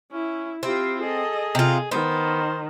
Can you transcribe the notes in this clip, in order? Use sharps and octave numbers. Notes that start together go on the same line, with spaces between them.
C#4 E4
C4 E4 F4 G4
G#4 A4 D#5
C3 F4
D#3 B3 C5